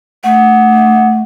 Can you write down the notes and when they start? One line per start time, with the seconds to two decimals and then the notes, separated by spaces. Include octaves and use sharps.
0.24 A3 F#5